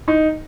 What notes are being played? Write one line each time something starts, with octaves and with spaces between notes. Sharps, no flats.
D#4